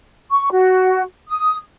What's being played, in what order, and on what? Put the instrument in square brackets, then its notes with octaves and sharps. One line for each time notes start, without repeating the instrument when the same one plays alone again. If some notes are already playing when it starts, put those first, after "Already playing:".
[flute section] C#6
F#4
D#6